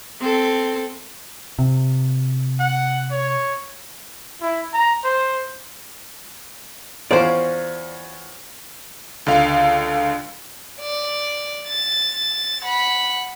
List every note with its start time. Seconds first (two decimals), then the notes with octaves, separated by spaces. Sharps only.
0.20 C4 A4
1.59 C3
2.60 F#5
3.11 C#5
4.41 E4
4.73 A#5
5.04 C5
7.11 E2 C#4 F4 C5 D5
9.26 C#2 D3 F5
10.81 D5
11.67 A6
12.63 F#5 B5